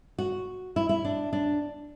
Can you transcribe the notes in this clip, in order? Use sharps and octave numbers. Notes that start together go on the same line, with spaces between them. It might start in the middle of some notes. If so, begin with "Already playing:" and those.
F#4
E4
E4
D4
D4